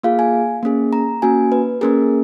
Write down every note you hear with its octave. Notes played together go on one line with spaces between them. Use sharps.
A#3 F4 G#4 F5
G#5
A#3 C#4 G#4
A#5
A#3 C#4 F#4 G#5
B4
A#3 C#4 G#4 A#4